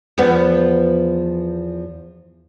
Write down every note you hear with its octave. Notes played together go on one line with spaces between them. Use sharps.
E2 F3 B3